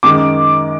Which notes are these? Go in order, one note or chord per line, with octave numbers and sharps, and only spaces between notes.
F#2 D#3 G#3 D6